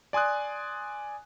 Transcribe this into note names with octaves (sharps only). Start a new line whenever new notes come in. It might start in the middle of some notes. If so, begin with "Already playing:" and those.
D5 G#5 C6 D#6 F#6